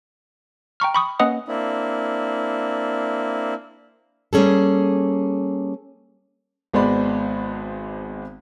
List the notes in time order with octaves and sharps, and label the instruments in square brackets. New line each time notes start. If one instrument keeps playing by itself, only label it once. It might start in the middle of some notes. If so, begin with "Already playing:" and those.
[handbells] G5 A#5 C#6 F6
B5 C#6 D#6
A#3 C#4 B4 D#5 F#5 D#6
[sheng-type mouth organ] A#3 C4 D4 E4
[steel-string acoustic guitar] G3 A#3 C#4 G#4 A4
[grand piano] G#1 G#3 B3 C5 D5 B5